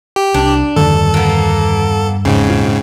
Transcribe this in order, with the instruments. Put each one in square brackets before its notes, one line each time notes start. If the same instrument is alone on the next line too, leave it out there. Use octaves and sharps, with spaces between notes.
[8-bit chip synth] G4
[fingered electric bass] C2 [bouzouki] D4
[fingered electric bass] E2 D3 D#3 [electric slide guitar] G2 A5 [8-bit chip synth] A4
[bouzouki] A#3 B3
[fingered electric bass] E1 [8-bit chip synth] G#2 C#3 [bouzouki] C4
[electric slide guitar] A#2 F4